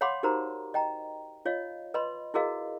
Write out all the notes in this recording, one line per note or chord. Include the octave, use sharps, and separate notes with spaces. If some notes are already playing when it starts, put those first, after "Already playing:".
C#5 F5 F#5 B5 C6 D6
D#4 F#4 G4 A#4 C5 A#5
D#5 G5 A#5
F4 C#5 D#5 F5
B4 D#5 B5 C6
E4 F#4 G#4 A#4 D#5 F5